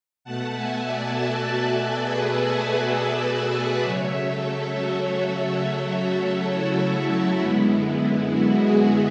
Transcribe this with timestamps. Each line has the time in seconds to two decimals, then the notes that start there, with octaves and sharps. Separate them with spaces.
0.24 B2 A3 F#5 A5
0.54 E5 G#5
0.85 D5 F#5
1.14 F#4 A4
1.44 F#4
2.03 G#4 B4
2.48 G#4 B4
2.92 B4 D5
3.37 B4 D5
3.82 C#3 F#3 A3 C#5 E5
4.27 A4 C#5
4.72 F#4 A4
5.62 F#4
6.51 E4
7.40 F#2 D3 G#3 B3
8.30 F#4
8.59 E4 G#4